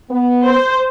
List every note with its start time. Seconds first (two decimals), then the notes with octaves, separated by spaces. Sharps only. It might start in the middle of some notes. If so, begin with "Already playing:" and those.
0.10 B3
0.46 C5